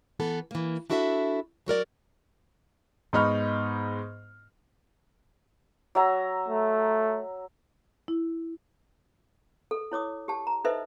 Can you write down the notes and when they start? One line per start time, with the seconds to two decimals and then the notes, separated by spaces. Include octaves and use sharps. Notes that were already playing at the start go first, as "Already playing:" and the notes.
0.20 E3 B3 A4
0.51 E3 A#3
0.90 D4 E4 F#4 A4 B4 E5
1.66 F#3 F#4 A#4 D5
3.13 G#2 B3 D#4 B5 C#6 F6
5.95 F#3 E5 A#5
6.49 A3
8.08 E4
9.71 A4
9.92 E4 C#5 D6 D#6
10.28 G4 A5
10.47 A#5
10.64 D#4 A4 B4 C5 D#5 E5